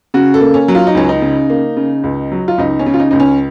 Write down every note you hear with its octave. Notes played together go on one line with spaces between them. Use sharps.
C#3 F#4
A4
A#3
C#4
F#3
F4
D#4
C#2 C#4
D#4
C#3
A#3
C#3
C#2
F#3
F4
C#2 D#4
C#4
C#3
F4
D#4
C#2 D#4
C#4